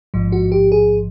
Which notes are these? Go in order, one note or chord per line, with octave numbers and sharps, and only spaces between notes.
A1 G#2 F3
F#4
G4
G#4